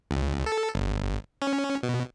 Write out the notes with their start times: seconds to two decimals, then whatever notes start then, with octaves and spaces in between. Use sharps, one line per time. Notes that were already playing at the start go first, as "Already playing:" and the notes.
0.11 C#2
0.46 A4
0.75 G1
1.42 C#4
1.83 B2